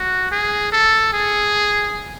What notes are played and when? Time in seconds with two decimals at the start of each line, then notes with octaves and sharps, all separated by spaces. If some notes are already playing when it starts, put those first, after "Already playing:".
Already playing: F#4
0.31 G#4
0.72 A4
1.13 G#4